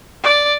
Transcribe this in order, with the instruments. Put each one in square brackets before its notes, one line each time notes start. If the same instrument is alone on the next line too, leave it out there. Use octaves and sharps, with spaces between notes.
[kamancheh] D5